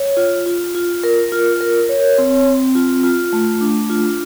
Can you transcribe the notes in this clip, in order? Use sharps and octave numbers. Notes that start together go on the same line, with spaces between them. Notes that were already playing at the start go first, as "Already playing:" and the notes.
Already playing: C#5
F4
F4
F4
A#4
F4
A#4
C#5
C4
C4
F4
F4
A3
D4
F4